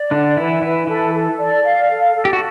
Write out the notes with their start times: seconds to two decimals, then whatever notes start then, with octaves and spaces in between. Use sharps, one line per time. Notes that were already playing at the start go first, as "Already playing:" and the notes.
Already playing: D5
0.11 D3 D4 F#5
0.36 E3 E4 B4
0.62 E3 E4 B4
0.87 E3 E4 A4
1.14 A4
1.38 D5
1.63 F5
1.90 A4
2.14 A4
2.25 G4
2.33 F#4